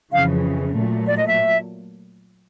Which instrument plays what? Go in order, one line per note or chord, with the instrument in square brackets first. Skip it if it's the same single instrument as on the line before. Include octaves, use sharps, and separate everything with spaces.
[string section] F2 C#3 E3 [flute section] F5
[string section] A#2 F#3 A3
[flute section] D5
D#5
E5